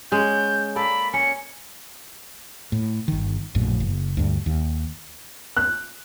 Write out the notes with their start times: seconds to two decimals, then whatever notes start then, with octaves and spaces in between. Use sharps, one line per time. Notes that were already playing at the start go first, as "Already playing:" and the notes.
0.12 G#3 C#4 G6
0.76 A#3 A4 D5 B5
1.14 C#4 C#7
2.72 A2
3.08 G1 D#3
3.55 A#1 F#2 A2
3.80 F#1
4.17 D2 G2
4.46 D#2
5.57 F#6